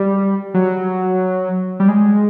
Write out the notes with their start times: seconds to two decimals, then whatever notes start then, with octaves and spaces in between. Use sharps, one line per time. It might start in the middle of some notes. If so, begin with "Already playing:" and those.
Already playing: G3
0.54 F#3
1.80 G3
1.88 G#3